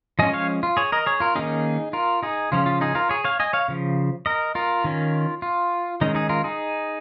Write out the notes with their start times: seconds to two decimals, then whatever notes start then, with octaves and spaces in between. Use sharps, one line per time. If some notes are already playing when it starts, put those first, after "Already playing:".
0.19 F3 G#3 C#4 D#5 G#5
0.33 C#5 F5
0.63 F4
0.77 G#4 C#5
0.92 A#4 D#5
1.06 G#4 C#5
1.20 F4 A#4
1.35 D#3 A#3 C#4 D#4 G#4
1.93 F4 A#4
2.23 D#4 G#4
2.52 C#3 F3 C#4 F4
2.66 F4
2.81 D#4 G#4
2.95 F4 A#4
3.09 G#4 C#5
3.24 C#5 F5
3.40 D#5 G#5
3.53 C#5 F5
3.68 C#3 F3
4.26 A#4 D#5
4.55 F4 A#4
4.84 D#3 C#4
5.42 F4
6.01 D#3 G#3 C#4 D#4
6.15 D#4 G#4
6.29 F4 A#4
6.44 D#4 G#4